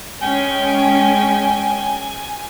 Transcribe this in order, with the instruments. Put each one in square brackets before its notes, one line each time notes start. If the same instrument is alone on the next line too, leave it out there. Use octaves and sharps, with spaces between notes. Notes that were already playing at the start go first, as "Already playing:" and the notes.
[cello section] G#3 C#4 [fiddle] G5 [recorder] G#5